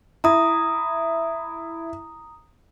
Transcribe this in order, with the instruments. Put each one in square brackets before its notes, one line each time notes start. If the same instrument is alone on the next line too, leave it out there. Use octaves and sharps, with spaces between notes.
[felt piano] E4 [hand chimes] A#5 D#6